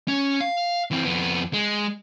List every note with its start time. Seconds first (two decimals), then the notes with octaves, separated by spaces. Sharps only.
0.08 C#4
0.41 F5
0.91 E3 C4
1.05 F2 B3
1.53 G#3